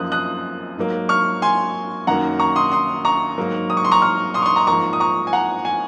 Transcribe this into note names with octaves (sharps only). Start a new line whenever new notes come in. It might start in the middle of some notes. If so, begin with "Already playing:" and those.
Already playing: F#2 F3 A#3 D#6 F#6
D#6 F#6
G#2 F#3 A#3
C#6 F6
G#5 C6
F#2 D#3 F#3 A#3 F#5 A#5
A#5 C#6
C6 D#6
C6 D#6
A#5 C#6
G#2 F#3 A#3
D#6
C#6
C6
A#5 C#6
C#6 F6
C6 D#6
C#6
C6 D#6
A#5 C#6
G#2 F3 A#3 A#5 C#6
D#6
A#5 C#6
G#5
F#5 A#5
G#5